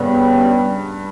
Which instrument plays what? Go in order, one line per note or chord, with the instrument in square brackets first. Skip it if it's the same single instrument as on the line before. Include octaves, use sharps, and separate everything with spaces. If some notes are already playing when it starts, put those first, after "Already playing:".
Already playing: [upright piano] G2 [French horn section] C#3 G3 B3